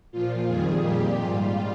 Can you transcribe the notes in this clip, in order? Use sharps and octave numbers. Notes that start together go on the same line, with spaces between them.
A#2 F3 F4
F2 D#3 G3 G#4
A#2 G3 G4
G#2 G3 F4